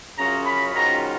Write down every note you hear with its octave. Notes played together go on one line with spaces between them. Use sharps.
F#2 C#3 F#3 C#4 F4 A#5
B5
G#2 D#3 F#3 C#4 F4 A#5